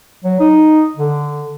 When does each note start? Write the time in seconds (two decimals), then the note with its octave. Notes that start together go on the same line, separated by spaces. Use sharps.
0.24 F#3
0.40 D#4
0.96 D3